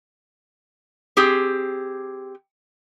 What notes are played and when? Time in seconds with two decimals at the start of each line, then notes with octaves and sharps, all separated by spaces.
1.17 C4 G4 G#4